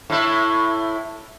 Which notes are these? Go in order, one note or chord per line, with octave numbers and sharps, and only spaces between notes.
A2 E4